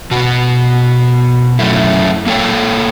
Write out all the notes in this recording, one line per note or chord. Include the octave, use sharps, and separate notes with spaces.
B2 F#4
F#2 A3 E4
A#3 A4 C#5 G5